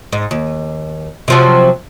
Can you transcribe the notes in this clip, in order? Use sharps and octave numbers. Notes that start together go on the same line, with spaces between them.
G#2
D#2
C3 F3 F#3